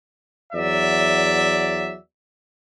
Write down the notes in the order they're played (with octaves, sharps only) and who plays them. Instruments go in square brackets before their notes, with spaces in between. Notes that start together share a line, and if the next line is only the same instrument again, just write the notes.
[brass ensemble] E2 F#3 D5 E5